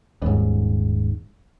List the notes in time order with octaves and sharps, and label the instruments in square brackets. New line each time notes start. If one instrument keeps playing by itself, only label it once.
[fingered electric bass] D#1 G#2